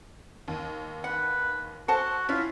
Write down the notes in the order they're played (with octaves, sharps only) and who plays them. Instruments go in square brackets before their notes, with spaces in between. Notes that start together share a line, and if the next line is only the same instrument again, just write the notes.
[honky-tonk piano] D#2
[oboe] B4 [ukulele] F#5
[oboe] F#4 [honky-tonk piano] A4 C5 [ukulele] F#5 A5
[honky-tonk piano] C#4 E4 [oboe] F4 [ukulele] E5